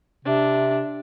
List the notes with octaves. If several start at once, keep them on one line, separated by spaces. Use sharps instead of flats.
C3 D4